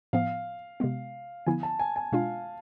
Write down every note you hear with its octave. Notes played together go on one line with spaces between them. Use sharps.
A2 F3 B3 F5
C3 G#3 B3
D3 F3 B3 E4 G#5
A5
G#5
G#5
B2 G#3 D4 F4 F5